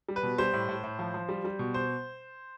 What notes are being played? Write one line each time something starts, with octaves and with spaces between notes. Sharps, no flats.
G3
B4
B2
G3 C5
A2
A2
A2
F3
F3
G3
G3
B2
C5